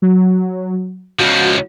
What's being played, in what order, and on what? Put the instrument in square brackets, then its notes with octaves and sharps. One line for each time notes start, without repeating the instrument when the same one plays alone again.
[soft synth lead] F#3
[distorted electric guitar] C#2 F3 [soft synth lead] F#4